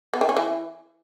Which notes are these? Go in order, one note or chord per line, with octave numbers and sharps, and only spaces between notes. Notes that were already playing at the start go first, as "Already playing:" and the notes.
B3
D#3
C#4
E3